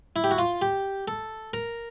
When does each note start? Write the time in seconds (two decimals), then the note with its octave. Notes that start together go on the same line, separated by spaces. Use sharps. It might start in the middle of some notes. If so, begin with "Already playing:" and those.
0.16 E4
0.24 G4
0.31 F#4
0.38 F4
0.62 G4
1.08 A4
1.54 A#4